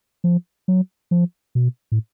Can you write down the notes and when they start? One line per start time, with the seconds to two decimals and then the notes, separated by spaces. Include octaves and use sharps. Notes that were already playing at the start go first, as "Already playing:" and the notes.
0.24 F3
0.68 F#3
1.11 F3
1.55 B2
1.92 A2